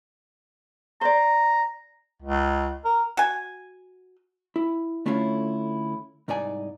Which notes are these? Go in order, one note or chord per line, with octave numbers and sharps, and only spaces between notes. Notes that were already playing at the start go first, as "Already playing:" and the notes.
C5 D5 A#5
C#2
A#4
F#4 G#5
E4
D3 A3 C#4 E4 F4 C#5
C2 G#2 D#4 D5 G#5